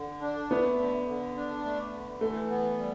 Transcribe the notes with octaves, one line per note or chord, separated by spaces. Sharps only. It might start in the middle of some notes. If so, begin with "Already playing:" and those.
Already playing: D3
D4
A3 B3
D3
D3
D4
A3
D3
E3 A3
B3
G3